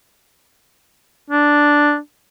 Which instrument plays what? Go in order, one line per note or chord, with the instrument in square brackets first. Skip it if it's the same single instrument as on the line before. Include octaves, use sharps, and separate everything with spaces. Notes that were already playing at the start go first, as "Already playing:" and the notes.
[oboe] D4